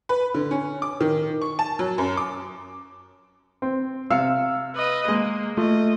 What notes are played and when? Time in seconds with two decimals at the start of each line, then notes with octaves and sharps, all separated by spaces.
0.09 B4
0.34 D3
0.51 C#4
0.82 D6
1.01 D#3
1.42 C#6
1.59 A5
1.79 F#3
1.98 F#2
2.17 D6
3.62 C4
4.10 C3 F5 E6 F6 C#7
4.76 B4 D#5
5.08 G#3 A#3
5.57 A3 F4 D#5